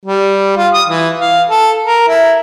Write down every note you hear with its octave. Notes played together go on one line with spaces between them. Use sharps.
G3
F4
D#6
E3
F5
A4
A#4
E4